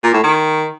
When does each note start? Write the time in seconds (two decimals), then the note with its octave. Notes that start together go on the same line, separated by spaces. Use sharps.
0.04 A#2
0.14 A2
0.23 D#3